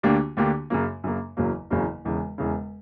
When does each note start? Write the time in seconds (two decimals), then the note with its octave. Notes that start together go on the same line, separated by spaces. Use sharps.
0.03 D2 D3 A#3 D4 G4
0.37 D2 D3 A#3 D4 G4
0.70 F#2 C#3 F#3 A#3
1.04 F#2 C#3 F#3 A#3
1.37 F#1 E2 C#3 F#3 A#3
1.70 F#1 E2 C#3 F#3 A#3
2.05 E1 E2 C#3
2.38 E1 E2 C#3